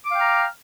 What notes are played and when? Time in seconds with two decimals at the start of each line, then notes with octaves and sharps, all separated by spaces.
0.06 D6
0.10 F5
0.14 G5
0.18 F6
0.21 A#5